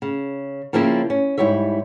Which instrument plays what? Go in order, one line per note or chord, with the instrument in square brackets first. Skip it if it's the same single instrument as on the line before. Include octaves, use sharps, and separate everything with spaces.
[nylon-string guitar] C#3
C#3 F3 A#3 C4 E4
C#4
G#2 G3 E4 C#5 E5